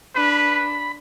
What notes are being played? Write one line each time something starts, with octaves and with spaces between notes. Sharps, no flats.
D4 B4 B5